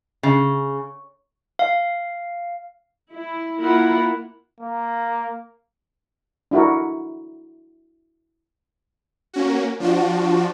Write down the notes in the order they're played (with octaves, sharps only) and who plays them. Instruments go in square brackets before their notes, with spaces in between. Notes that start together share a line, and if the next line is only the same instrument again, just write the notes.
[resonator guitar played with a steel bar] C#3
[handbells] F5
[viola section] E4
A#3 E4 F4 A#4 F#5 B5
[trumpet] A#3
[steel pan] D4 E4 F#4 A#4
[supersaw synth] A#3 C#4 F#4
F3 D4 F4 F#4